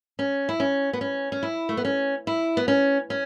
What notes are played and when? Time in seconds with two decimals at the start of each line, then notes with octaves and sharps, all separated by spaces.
0.19 C#4
0.49 E4
0.60 C#4
0.93 B3
1.01 C#4
1.32 C#4
1.43 E4
1.69 A3
1.77 B3
1.85 C#4
2.27 E4
2.57 B3
2.68 C#4
3.10 C#4